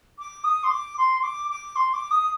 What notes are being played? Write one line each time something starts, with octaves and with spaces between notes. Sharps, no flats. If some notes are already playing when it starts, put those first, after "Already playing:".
D6
D#6
C6
D6
C6
C6
D6
D6
C6
D6
D#6